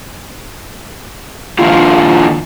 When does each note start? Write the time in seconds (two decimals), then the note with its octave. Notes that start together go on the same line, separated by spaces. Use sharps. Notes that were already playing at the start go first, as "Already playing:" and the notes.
1.59 D#3 F3 A#3 D4 E4 F4